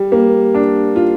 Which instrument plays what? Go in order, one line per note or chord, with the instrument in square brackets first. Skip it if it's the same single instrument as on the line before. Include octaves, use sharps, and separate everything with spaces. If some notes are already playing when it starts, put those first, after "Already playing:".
Already playing: [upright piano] G3
A#3
D4
F4